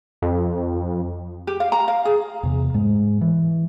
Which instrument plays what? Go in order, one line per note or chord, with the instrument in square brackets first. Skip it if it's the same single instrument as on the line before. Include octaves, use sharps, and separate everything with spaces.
[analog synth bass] F2
[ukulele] G4
F5
A#5
F5
G#4
[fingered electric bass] E2 C3
G#2 G#3
E3